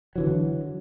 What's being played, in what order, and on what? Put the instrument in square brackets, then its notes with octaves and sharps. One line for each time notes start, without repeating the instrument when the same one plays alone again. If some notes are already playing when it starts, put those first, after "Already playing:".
[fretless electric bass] D3 E3 F#3